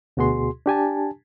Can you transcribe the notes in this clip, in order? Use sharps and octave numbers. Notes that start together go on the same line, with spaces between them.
D2 B2 F#4 G#4 C6
D4 G4 G#5 A5